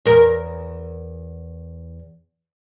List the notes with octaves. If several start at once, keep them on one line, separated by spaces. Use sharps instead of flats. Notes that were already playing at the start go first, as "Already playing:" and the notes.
E2 A#4